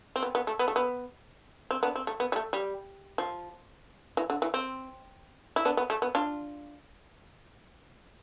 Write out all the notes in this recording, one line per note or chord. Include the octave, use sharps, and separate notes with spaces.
C4
B3
B3
A3
B3
A3
B3
C4
B3 D4
C4
A3
B3
G3
A3
G3
F3
E3
D3
E3
C4
E4
B3 D4
B3
A3
B3
D4 F4